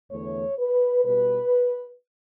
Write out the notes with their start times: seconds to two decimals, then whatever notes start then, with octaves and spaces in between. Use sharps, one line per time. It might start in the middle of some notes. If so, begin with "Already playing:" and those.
0.11 E2 D3 A3 C#5
0.59 B4
1.05 B2 G3 B4